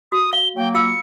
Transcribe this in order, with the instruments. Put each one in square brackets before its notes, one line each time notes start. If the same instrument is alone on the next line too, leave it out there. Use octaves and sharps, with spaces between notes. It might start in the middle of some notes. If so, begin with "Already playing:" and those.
[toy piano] F#4 [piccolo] D#6
[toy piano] F5 [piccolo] G7
[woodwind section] F#3 A#3 [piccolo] G5
[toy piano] F4 F5 E6 [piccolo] C#7